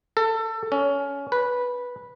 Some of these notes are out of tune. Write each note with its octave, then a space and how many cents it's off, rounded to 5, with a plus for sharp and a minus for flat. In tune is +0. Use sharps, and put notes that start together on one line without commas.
A4 +25
C#4 +20
B4 -10